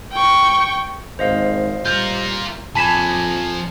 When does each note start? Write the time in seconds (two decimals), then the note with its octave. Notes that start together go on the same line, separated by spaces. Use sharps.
0.13 G5 C#6
1.19 G#1 C5 D#5 F5
1.85 G3 F4 A#4 G6
2.75 F2 F3 G#5 A5 B5 G#6 B6 E7